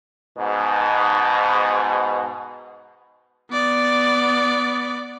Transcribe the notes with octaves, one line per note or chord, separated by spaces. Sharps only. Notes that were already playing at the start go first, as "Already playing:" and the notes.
G#2 B2
B3 D5